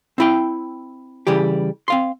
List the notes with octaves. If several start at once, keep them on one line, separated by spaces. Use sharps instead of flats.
C4 E4 G5
C#3 E3 G3 G4
C4 F5 C6